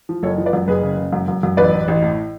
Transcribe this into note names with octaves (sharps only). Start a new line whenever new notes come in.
F3
F#1 A4 C#5
F3
B4 D5
F#2
F#1 G#4 B4
C#3
C#3
F#2
F#2
F#2
A1 B4 D5
A1
A1
A2